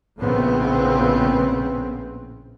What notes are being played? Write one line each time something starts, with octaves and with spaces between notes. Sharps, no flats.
A#1 A2 C#3 B3 C4